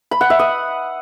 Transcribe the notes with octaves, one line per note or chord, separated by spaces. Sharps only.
B5
F#5
E5
D#6